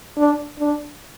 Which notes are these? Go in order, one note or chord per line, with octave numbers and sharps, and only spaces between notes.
D4
D4